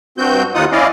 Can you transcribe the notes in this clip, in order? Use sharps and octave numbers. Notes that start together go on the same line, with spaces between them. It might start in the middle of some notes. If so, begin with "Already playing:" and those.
G2 C4 F#4 G6
D#2 D#4 F4 F#5 D#6
C#4 E4 D5 D#5 F5